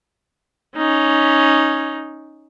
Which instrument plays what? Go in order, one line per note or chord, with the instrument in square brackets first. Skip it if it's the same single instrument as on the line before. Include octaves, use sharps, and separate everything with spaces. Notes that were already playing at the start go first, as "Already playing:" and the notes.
[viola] C#4 D#4